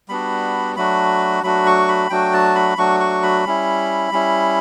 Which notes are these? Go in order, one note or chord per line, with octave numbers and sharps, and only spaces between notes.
G3 B3 D4 F#4 B5
F#3 A3 D4 F#4 B5
F#3 A3 D4 F#4 B5
C#6
B5
F#3 A3 D4 F#4 G5
A5
B5
F#3 A3 D4 F#4 C#6
C#6
B5
G3 C#4 E4
G3 C#4 E4